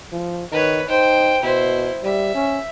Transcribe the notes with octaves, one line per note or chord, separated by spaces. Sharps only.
F3
D#3 B4 C#5
D#4 C5 G5
B2 E4 C5
G3 E5
C#4